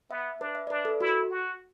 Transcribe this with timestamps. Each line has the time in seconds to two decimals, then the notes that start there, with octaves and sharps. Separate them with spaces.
0.11 B3 E5
0.40 D4 B4
0.55 E5
0.67 D5
0.70 D4 B4
0.85 A4
1.01 E4 F#4
1.31 F#4